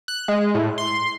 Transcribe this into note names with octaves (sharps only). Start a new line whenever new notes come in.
F#6
G#3
A2
C6